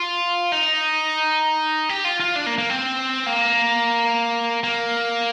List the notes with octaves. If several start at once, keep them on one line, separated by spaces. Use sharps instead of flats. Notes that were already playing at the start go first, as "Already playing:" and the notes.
Already playing: F4
D#4
G4
F4
F4
D4
A#3
A#3
C4
A#3
A#3